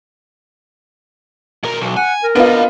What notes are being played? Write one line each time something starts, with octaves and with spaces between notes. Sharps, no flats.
B2 A#4
B1
F#5 G#5
A#4
B3 D4 F4 D#5